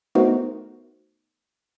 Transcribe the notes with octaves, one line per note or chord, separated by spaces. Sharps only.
A3 B3 D#4 F#4 A#4 C5